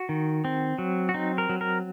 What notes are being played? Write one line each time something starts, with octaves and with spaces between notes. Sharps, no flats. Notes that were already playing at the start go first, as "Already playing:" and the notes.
Already playing: F#4
D#3
C4
F#3
F#4
C4 D#4
A#4
F#3
A#4